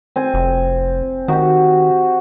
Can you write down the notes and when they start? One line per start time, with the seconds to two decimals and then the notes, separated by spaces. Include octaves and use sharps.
0.16 C4 G#5
0.34 F1
1.28 D#3 F#4 G4